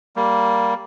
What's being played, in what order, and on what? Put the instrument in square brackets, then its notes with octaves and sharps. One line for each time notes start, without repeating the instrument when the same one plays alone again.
[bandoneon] G3 A#3